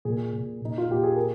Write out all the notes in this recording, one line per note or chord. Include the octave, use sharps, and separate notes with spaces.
A#2 G#4
A#2
A#2 D#4
F4
A#2 G4
G#4
A#4